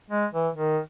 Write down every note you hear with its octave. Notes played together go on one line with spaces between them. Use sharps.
G#3
E3
D#3